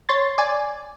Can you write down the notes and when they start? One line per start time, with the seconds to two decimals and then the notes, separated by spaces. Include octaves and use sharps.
0.09 C#5 C6 A6
0.38 D5 G#5